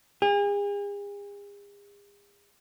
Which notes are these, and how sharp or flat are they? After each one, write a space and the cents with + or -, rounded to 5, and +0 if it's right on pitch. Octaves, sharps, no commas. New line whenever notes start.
G#4 -40